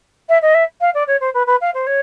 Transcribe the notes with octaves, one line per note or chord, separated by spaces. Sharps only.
E5
D#5
E5
F5
D5
C#5
C5
B4
B4
F5
C5
C#5